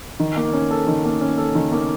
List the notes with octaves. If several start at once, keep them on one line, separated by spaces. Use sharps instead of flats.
D#3
A#3
C#4
A4
D#3
A#3
C#4
A4
D#3
A#3